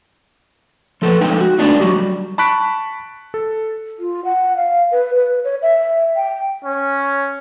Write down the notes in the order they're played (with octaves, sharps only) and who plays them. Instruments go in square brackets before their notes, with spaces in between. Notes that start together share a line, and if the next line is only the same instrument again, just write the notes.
[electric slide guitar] F3 A4 B4
F2 G#3 D#4 A4 G5
F#4
G#3 A3 B3 D4 D#4 F4
F#3 F#4 G4
G3
[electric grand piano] A5 B5 C#6 F#6 B6 D7
A4
[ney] F4
F#5
F5
B4
B4
C#5
E5
G5
[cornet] C#4